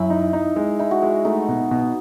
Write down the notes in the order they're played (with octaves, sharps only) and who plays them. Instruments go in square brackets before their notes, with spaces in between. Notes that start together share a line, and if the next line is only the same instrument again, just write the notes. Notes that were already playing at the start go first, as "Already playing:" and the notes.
Already playing: [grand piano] F#2 [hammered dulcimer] E4
[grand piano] D#4
D#4
G#3
[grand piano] D#4 [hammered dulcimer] E4
[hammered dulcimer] F#4
[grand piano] G#3
[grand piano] A3 [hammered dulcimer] D#4
[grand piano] B2
B2